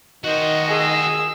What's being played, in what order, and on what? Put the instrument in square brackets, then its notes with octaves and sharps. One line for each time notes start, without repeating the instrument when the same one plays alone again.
[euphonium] D#3 [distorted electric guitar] F#4 C5 [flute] D#5
[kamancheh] G#4 E6